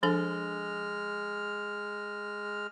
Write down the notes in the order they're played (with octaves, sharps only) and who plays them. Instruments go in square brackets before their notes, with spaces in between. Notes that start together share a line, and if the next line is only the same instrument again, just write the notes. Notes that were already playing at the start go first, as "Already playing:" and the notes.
[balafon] F3 D4 A4 [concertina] G#3 F6